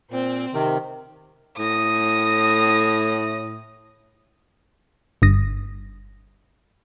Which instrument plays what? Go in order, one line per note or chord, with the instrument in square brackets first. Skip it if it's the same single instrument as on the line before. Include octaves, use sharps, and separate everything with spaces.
[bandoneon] A#2 [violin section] C4
[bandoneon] C3 D#3
[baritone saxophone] A2 [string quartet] D#6 A#6
[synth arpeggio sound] G1 G2 D#6 A#6